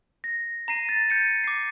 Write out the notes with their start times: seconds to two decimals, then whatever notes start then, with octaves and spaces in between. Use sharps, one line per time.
0.24 A#6
0.68 A#5 A#6 C7 D#7
0.89 A6
1.10 G6 A6 C#7 D#7
1.44 D6 C7